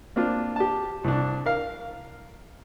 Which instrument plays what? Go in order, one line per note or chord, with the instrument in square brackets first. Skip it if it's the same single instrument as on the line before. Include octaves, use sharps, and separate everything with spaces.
[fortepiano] A#3 C4 D4 F4
G4 A5
C2 D4
A#4 F5